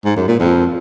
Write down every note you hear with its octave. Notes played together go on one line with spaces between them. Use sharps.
G#2
F#2
A#2
F2